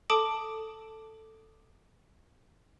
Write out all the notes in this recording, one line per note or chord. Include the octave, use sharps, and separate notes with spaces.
A4 A5 D6 D#6 D7